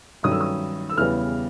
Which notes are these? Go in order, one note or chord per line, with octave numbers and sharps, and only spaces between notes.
G2 D#3 F#3 A3 C#4 D#6
E6
D#6
E6
E2 C#3 E3 G3 B3 F6